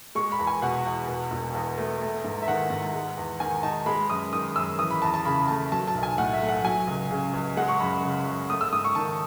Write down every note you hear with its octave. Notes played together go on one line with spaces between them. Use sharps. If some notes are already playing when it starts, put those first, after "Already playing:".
G#3 C#6
B5
E2
G#5
B2 F#5
E2
B2
E1
E2
A3
A3
G#2
E5
D#3 F#5
G#2
G#3
E2
D#3 G#5
D#4 A5
G#3 B5
F#2 D#6
D#3 D#6
F#2 E6
E3 D#6
B5
E2 A5
A5
C#3 B5
A3 A5
F#3 A5
A5
B1
G#5
A2 F#5
E5
A3
F#5
F#3 G#5
C#2
C#3
C#2
G#3 F#5
C#6
F#2 B5
C#3
F#2
A3 D#6
E6
G#2 D#6
C#6
D#3 A5